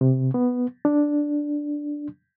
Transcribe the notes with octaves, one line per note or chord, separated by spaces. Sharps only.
C3
B3
D4